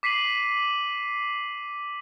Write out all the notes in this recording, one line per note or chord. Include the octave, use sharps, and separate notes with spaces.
D6 B6 C7 D#7 F#7